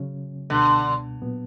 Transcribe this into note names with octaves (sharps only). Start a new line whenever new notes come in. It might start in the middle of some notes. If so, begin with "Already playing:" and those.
Already playing: C#3 F#3 C#4
C#2 B2 D3 G3 B3
A#2 F#3 B3